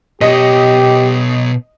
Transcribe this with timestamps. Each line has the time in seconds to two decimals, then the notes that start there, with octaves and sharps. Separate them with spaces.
0.21 B2 G4 C#5 D#5